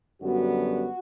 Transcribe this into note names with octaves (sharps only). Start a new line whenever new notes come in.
F#2 D3 G3 B3 F#4